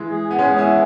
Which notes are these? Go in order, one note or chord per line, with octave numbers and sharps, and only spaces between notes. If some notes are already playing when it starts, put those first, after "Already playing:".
Already playing: E3 G#3
G#4
B3
G#3 C#4 G#4
B3 E4
E3